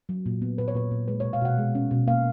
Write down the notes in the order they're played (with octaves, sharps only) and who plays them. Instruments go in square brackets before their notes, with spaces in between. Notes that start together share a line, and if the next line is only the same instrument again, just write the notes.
[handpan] F#3
A#2
B3
A#2 B4
C#5
A#2 B4
A#2
G#3 B4
C#5
B2
F5
B2 F#5
G#3
C#4
B2
A#3 F5